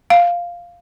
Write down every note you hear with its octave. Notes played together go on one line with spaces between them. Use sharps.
F5